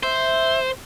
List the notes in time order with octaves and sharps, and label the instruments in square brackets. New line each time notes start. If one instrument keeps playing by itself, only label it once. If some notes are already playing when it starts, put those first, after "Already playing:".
[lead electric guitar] C5 [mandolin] E5